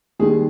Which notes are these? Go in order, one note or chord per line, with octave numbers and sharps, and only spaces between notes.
D#2 D#3 G3 G#3 G#4